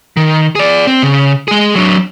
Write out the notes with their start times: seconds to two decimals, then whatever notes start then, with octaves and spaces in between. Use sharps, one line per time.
0.17 D#3
0.55 G#4 D5
0.87 C4
1.03 C#3
1.48 G#3 G#4
1.76 F#3 D4